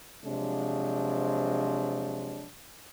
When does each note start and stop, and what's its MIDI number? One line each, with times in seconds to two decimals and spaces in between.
0.25 2.46 48
0.25 2.46 53
0.25 2.46 54
0.25 2.46 56
0.25 2.46 62